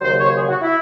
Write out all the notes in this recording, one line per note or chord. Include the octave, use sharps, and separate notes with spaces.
D#2 C#3 F#3 C5
C#5
C5
G#4
F#4
E4